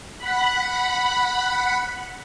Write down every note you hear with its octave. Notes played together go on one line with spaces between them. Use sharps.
F#5 B5